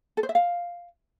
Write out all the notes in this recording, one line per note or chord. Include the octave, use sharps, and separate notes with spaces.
A4
C5
E5
F5